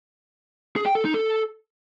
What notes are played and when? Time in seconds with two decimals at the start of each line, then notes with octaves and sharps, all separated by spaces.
0.76 G#4
0.86 G5
0.95 A4
1.05 D#4
1.14 A4